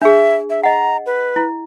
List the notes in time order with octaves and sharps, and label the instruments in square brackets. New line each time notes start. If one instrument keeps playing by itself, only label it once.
[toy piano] D4 G#4 [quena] E5
[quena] E5
[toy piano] D#5 F#5 [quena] A#5
[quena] B4
[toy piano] E4